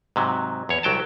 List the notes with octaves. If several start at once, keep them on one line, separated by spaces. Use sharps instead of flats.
G#2 C3 F#3
E2 C#5
C2 F#3 G5 A5